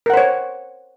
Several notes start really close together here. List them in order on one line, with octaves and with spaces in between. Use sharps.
A#4 F#5 C5 C#5